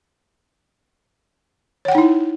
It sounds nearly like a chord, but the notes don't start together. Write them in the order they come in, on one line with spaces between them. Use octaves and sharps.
C#5 F#5 G5 D#4 E4